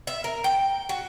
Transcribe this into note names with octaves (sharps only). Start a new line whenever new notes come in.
E5
A#4
G5
F#4